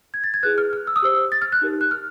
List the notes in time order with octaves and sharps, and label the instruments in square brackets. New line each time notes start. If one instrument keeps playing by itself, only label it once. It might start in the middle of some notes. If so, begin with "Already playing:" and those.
[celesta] G#6
A6
G#6
E4 G#4 B4 F#6
F6
F6
E6
D#6
G4 C5 E6
A6
F6
F#6
D#4 G4 A#4
F#6
F6